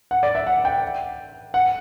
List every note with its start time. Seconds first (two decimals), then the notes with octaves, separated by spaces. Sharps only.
0.11 F#5
0.23 D5
0.35 E5
0.47 F#5
0.65 G5
1.54 F#5